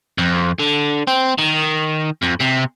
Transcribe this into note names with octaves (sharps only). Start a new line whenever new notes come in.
F2
D3
C4
D#3
F2
C3